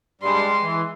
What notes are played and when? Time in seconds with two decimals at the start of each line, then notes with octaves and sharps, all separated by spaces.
0.21 G2 G3 G#3 C6
0.62 E3